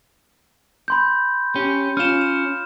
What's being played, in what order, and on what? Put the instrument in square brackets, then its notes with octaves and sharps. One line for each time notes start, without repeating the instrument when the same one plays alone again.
[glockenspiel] B5 C6 G6
[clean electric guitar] C#4 G4
[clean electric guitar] C#4 F4 [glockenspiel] F6 E7
[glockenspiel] E7